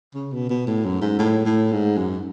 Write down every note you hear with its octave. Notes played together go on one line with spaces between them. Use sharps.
C#3
B2
B2
A2
F#2
G#2
A2
A2
G#2
F#2